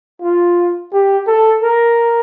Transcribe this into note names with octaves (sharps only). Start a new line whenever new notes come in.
F4
G4
A4
A#4